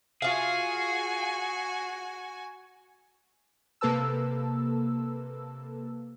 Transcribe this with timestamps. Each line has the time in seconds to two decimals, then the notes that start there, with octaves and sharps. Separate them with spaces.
0.22 F4 F#4 G#4 F5 G#5
3.81 C3 A#3 A4 B4 A5 E6